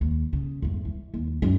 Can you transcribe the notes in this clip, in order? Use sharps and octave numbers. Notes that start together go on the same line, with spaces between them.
D#2
C#3
E2 G2
E3
D#2
F#2 D#4